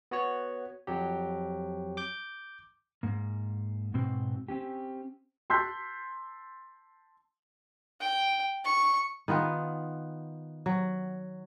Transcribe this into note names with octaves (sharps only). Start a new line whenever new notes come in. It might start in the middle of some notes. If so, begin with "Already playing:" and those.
B3 F#4 C#5
F2 F#3 G4
D6 G6
G#2 A#3
G#2 B2 C4 F#4
C4 C#4 G4
A5 C6 E6 F#6 G6 B6
G5
C#6
D#3 B3 F4 B4
F#3